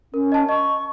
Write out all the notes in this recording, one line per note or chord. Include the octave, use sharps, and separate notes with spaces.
C#4 A#4
D#5 A5
D#5 C#6